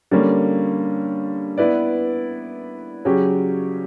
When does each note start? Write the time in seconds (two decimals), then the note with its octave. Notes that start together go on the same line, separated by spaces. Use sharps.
0.11 D3 G3 A#3 C#4
1.58 B3 E4 B4 D5
3.05 C#3 F#3 C#4 G4